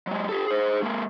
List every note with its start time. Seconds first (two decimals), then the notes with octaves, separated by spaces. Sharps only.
0.07 F#3 G#3
0.29 G4 A4
0.47 G#4 C5
0.82 G#3 A#3